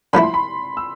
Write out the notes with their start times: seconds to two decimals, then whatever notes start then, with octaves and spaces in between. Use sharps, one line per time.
0.13 D3 F3 A3 E4 B5
0.23 C6
0.34 B5
0.77 E6